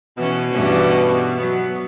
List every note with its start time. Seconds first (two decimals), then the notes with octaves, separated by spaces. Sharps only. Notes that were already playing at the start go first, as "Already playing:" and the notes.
0.18 B2 E3 C#4
0.52 G2 E3 C#4
1.36 F#3 B3